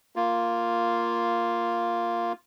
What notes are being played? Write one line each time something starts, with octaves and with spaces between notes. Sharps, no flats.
A#3 F4